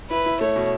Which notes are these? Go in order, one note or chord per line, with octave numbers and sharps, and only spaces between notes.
E4 B4
E4
A3 C#5
B2